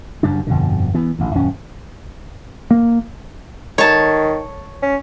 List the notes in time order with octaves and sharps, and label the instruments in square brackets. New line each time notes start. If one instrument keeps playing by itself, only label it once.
[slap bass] F#1 F#2 G3 D4
G1 F2 B2 D3
E3 B3
A1 D2
D#1 F#2 C#4
[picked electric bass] A#3
[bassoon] D#3 [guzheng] C#5 A5
[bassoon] C#4